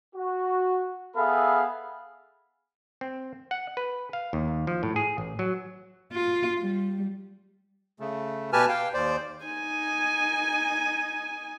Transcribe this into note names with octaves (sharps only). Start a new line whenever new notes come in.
F#4
B3 G#4 A4 E5 F5 B5
C4
F#5
B4
F5
D#2
F3
A2
G#4
A1
F#3
F4
G3
C#3 A3
B2 G4 B4 G#5 A5 F6
F5 G5
D#2 C5 D5
D#4 G#5